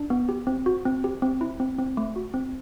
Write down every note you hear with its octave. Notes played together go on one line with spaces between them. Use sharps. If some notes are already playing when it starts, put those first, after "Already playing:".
Already playing: D4
B3
G4
C4
F#4
C4
G4
C4
E4
C4
C4
A3
F#4
C4